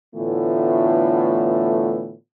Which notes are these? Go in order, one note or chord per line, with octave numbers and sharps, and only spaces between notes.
A2 D3 E3 A3 B3 F4